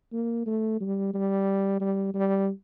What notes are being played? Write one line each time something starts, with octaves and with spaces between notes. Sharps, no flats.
A#3
A3
G3
G3
G3
G3